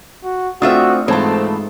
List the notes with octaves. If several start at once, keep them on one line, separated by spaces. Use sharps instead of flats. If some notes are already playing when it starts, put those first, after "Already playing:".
F#4
A3 C4 D4 F4 F#4 E5 D#6
G#2 E3 A3 C4 F4 A5